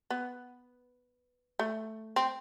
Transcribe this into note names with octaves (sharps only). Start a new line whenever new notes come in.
B3
A3
C4